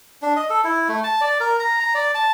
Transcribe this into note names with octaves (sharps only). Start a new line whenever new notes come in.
D4
D#5
A4
E4
A3
A5
D5
A#4
A#5
A#5
D5
A5